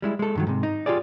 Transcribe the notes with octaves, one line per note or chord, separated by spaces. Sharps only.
G3 G#3 E4
G#3 A4
G2 D#3 F#3
G#2 C3
D#4
F4 G4 G#4 D5